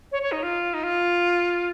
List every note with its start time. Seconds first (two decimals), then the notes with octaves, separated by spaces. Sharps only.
0.12 C#5
0.22 C#5
0.32 D#4
0.43 F4
0.74 D#4
0.83 F4